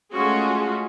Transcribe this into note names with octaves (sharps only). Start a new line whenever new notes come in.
G#3 A3 C#4 F4 F#4 G#4